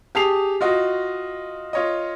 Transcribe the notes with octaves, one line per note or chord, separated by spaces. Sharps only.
G4 G#4 A5 D#6 C7 F7
F4 F#4 D#5
F4 C#5 D#5